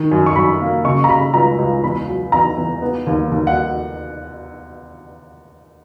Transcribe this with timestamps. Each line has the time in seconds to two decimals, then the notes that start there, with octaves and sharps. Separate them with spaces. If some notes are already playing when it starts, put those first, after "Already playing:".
Already playing: D#3
0.11 F#2
0.26 C#6
0.36 F#2 B5
0.61 A#3
0.85 C#3 C#6
1.04 A#5
1.09 C#3 B5
1.34 C#2 A#5
1.59 C#2
1.84 E2 B5
2.08 F#3
2.32 E2 A#5
2.57 E2
2.82 B3
3.07 D#2
3.31 D#2
3.47 F#5